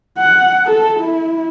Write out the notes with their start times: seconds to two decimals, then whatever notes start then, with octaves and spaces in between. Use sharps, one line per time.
0.18 F#5
0.65 A4
0.99 E4